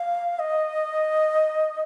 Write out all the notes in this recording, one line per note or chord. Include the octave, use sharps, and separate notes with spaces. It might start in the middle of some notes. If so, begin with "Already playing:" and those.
Already playing: F5
D#5